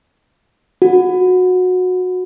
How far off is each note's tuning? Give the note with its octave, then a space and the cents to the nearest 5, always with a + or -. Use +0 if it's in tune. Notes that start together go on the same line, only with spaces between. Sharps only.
F#4 -20